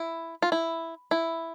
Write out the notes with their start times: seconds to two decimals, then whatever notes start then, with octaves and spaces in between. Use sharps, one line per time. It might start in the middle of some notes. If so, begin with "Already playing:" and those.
Already playing: E4
0.42 F4
0.52 E4
1.11 E4